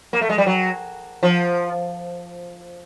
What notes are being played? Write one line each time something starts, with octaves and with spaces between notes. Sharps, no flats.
A#3
A3
G#3
G3
F#3
F3